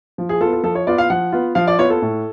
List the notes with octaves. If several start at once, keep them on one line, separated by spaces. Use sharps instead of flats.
F3
G#4
B3 F4 A4
A4
F3 A4
C#5
B3 F4 D5
F5
F3 F#5
B3 F4
F3 F5
D5
B3 F4 C#5
A4
A2